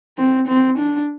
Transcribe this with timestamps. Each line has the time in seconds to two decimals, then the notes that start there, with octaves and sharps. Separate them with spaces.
0.18 C4
0.48 C4
0.78 D4